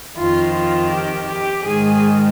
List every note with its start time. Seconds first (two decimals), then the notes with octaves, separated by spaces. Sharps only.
0.17 F2 D#3 F4
0.54 F4
0.91 G4
1.28 G4
1.65 G#2 D#3 G#4